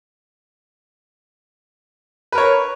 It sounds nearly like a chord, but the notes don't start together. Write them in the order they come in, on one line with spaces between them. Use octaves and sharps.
B4 A#4 C#5